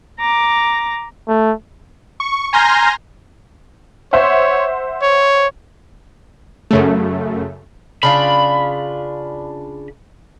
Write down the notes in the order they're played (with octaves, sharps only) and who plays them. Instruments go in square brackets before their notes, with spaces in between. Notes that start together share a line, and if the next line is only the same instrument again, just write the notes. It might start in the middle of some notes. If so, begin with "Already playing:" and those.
[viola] A#5 D6
[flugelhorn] A3
[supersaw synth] C#6
G#5 A#5 C6 F6 G6 A#6
[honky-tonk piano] C5 E5 F#5 [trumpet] C#5
[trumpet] C#5
[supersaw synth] F#2 C#3 A3
[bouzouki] C#3 D4 F4 [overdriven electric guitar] B5